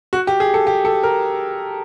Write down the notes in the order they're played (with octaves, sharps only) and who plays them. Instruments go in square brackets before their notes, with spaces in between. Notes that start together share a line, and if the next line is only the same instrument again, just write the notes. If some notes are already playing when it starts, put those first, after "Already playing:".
[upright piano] F#4
G4
G#4
A4
G4
A4
A#4